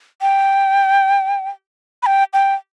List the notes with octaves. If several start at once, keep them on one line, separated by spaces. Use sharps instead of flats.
G5
B5
G5
G5